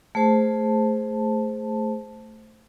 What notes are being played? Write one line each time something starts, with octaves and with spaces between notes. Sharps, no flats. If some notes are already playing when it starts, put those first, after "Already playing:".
A3 G#4 C5 A5